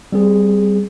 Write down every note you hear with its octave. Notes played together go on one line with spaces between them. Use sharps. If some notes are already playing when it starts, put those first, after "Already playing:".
G3 C4 G#4